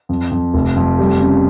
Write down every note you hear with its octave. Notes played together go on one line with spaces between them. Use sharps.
F2
F2
F1
F2
G3
C#3